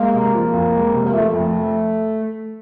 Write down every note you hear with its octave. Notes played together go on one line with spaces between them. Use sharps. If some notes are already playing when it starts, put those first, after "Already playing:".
Already playing: G#3 A#3
C3
F3
F2
G#3
C3
A#3
F3 A3
F2